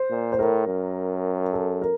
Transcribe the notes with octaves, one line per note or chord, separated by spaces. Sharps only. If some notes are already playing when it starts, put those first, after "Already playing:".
Already playing: C5
A#2
C5
A2 A#4
F#2
A4
A#4